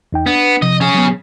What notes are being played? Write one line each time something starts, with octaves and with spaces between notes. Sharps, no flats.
E2 D#4 G5
B3 D4
C3 F3 D#5
C#4 G#4
F#3 B3